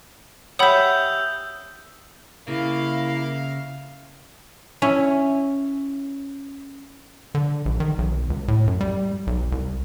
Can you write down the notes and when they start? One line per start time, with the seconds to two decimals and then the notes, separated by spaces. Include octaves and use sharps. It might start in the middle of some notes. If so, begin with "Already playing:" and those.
0.59 G4 C#5 E5 F#5 B5 D#6 E6 G6
2.48 C#3 A#3 E4 E5 F5
4.82 C#4 E4
7.35 D3
7.66 A#1
7.80 D#3
7.98 B1
8.30 C#2
8.48 A2
8.67 F#2
8.81 G3
9.27 B1
9.52 C2